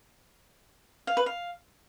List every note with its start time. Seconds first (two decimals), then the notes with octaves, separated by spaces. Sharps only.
1.07 F5
1.17 B4
1.26 F5